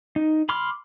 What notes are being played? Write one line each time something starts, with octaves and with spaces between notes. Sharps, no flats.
D#4
B5 C6 D6 F6